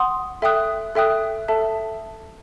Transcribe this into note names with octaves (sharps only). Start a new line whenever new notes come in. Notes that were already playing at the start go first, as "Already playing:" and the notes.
Already playing: F#5 C6 D#6
A4 E5 G5 D#6 F#6
A4 E5 G5 D#6 F#6
A4 E5 A5